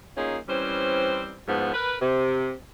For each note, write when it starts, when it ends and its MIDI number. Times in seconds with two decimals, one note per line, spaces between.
0.16 0.37 58
0.16 0.37 61
0.16 0.37 63
0.16 0.37 65
0.16 0.37 68
0.48 1.36 52
0.48 1.36 55
0.48 1.36 60
0.48 1.36 61
0.48 1.36 72
1.47 1.70 38
1.47 1.70 44
1.47 1.70 53
1.47 1.70 59
1.73 1.96 70
1.73 1.96 71
2.00 2.53 48